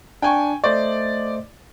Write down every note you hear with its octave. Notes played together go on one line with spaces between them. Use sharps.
D4 G5 G#5 C#6
A3 C5 D5 D#5